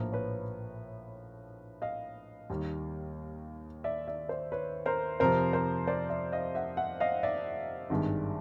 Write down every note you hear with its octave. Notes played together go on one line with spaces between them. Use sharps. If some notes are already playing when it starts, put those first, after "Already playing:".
Already playing: A#1 A2 F3 A#3 A#4
B4 C#5
D#5 F5
D#2 D#3 G3 A#3
D5 E5
D5 E5
C5 D5
B4 C#5
A#4 C5
F2 C3 F3 A#4 C5
A#4 C5
C5 D5
D5 E5
D#5 F5
E5 F#5
E5 F#5
D#5 F5
D5 E5
G#1 G2 D#3 G#3